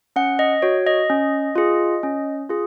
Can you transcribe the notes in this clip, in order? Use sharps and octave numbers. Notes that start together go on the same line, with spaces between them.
C#4 F#5
D#5
F#4 C#5
D#5
C#4
F4 G#4
C#4
F4 G#4